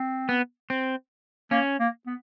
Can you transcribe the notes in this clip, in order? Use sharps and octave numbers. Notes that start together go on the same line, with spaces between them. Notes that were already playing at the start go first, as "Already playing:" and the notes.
Already playing: C4
B3
C4
A#3 C#4
A#3
B3